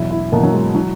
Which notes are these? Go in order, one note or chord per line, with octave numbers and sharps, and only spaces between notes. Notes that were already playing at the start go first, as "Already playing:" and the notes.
Already playing: E2 B2 F#3 E4
E4
E2 B2 F#3 A#3
F#3
G#3
E3 F#3